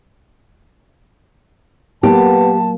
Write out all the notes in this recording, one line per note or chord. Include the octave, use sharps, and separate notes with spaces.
F#3 A#3 B3 G4 A5